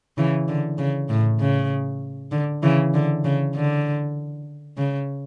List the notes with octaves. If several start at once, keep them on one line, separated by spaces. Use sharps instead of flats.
C#3 E3
D3
C#3
A2
C#3
D3
C#3 E3
D3
C#3
D3
C#3